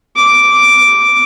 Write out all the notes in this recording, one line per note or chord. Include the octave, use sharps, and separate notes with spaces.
D6